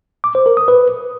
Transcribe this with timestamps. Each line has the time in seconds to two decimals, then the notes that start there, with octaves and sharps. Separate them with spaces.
0.24 D6
0.35 C5
0.46 A#4
0.57 D#6
0.68 B4